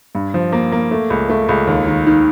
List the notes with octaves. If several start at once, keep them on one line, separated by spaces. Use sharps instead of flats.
G2
F3
A#3
A#3
A3
C#2
A3
C#2
D#2
D#3
D#3